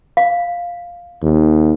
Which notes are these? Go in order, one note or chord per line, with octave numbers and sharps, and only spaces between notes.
F5
D#2